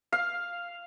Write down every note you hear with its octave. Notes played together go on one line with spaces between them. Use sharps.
F5